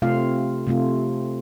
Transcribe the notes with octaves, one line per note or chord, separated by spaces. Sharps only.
C3 A3 C4 F4 F5
C3 A3 C4 F4